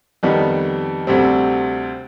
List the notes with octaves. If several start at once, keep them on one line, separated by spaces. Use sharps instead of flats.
F2 D#3 G3 B3
D2 C3 G3 C4